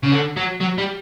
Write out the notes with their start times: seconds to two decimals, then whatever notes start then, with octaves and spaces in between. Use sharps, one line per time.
0.03 C#3
0.12 D3
0.37 F#3
0.61 F#3
0.78 G3